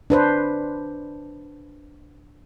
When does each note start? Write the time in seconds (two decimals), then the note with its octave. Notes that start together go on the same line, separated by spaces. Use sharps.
0.10 D4 B4 C5